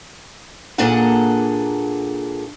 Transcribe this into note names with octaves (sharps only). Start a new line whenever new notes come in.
A#2 A#3 D4 G#4 A4 F#5